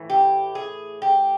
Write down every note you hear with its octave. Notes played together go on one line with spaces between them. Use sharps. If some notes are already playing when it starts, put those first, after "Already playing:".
Already playing: A2 E3
G4
G#4
G4